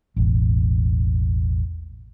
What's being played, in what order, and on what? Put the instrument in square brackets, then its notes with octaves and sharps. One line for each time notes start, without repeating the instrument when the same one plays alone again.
[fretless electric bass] E1 A1